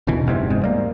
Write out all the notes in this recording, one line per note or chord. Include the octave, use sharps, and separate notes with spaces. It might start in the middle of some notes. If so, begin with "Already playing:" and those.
E1 D2 B2 E3
F#1 E2 G#2 C3
G#2
G3 A#3